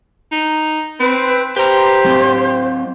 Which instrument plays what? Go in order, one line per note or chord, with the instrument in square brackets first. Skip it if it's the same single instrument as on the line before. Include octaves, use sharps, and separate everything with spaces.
[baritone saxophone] D#4
[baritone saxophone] C4 [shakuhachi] B4
[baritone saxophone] G4 [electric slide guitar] B4 A#5 [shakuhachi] C5
[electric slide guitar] F#3 C4